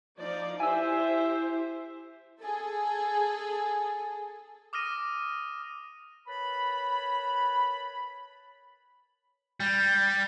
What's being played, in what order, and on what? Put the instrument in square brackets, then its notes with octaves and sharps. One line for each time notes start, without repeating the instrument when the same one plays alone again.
[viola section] F3 D#4 D5
[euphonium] E4 [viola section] G4 C5 [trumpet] E5 [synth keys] G#5 E6
[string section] G#4 A4
[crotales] D6 D#6 F6 A#6 D#7
[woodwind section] A#4 B4 C#5 A5 B5
[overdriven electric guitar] G3